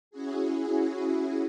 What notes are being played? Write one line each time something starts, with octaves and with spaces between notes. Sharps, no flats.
C#4 E4 F#4 G#4